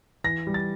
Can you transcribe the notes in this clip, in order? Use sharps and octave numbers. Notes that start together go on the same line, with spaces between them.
E3 A#6
G3
A6